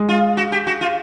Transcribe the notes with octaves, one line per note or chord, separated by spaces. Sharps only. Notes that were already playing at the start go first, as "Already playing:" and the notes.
Already playing: G#3
F4
F#4
G4
F#4
F4